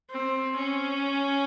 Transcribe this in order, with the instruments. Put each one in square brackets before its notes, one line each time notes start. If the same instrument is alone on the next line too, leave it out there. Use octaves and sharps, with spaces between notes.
[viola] C4
C#4